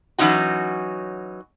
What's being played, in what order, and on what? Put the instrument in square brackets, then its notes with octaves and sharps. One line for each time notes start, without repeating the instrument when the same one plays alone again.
[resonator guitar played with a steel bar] E3 F#3 C#4 D#4 F#4